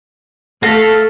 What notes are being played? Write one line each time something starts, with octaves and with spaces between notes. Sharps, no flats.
A3 A4 F5 A#6 B6